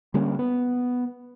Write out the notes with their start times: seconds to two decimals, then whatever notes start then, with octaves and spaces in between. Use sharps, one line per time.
0.14 D3 G3 A#3 C#4
0.39 B3